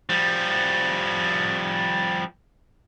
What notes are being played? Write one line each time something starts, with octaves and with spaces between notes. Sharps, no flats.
F3 G3